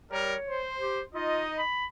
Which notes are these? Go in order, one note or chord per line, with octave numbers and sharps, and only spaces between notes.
G3 A#4 C#5
C5
G4
D#4 F4 D#5
B5